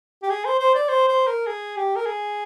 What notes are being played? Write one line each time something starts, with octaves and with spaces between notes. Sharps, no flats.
G4
G#4
C5
C5
D5
C5
C5
A#4
G#4
G4
A#4
G#4